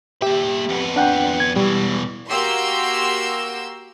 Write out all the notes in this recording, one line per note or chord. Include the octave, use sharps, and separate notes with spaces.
A#3 G4 E5
F2 B3
D4 F#5 G5
G#6
B2 E3 G3
A#3 F#4 G4 C6 E6 G6